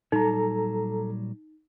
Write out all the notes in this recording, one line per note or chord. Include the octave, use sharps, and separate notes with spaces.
A#2 F#3 G3 D#4 A4 A#5